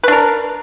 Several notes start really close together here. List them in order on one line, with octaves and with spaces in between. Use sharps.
B4 D4 A#4